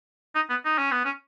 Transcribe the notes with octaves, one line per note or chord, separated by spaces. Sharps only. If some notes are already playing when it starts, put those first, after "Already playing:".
D#4
B3
D#4
C#4
B3
C#4